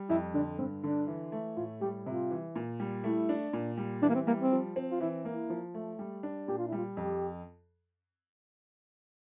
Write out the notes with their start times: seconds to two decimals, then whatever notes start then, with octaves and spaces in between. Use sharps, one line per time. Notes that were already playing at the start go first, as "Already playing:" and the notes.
Already playing: G3
0.10 F2 E4
0.34 D3 D4
0.58 G2 C4
0.83 D3 D4
1.07 E3
1.32 A3
1.57 A2 F4
1.81 G3 G4
2.06 C3 F4
2.31 E3
2.56 A#2
2.80 G3
3.04 A3 E4
3.29 D4
3.53 A#2
3.78 G3
4.02 E3 D4
4.09 A#3
4.15 C4
4.27 G3 A#3
4.40 C4
4.52 F3
4.76 C4
4.91 F4
5.00 E3 E4
5.25 A#3 E4
5.50 F3
5.74 A3
5.99 G3
6.23 D4
6.48 A#2 G4
6.58 F4
6.67 E4
6.72 G3 F4
6.97 F2 G4